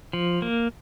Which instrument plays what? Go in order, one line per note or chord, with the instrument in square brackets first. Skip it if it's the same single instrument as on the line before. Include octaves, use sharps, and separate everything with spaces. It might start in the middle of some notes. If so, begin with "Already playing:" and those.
[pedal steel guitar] F3
A#3